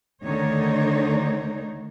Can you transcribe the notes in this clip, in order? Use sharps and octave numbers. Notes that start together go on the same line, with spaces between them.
D2 D3 D#3 D4 D#4 C#5